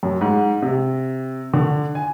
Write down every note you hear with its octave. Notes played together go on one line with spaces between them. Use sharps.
F#2
G#2
C3
D3
G#5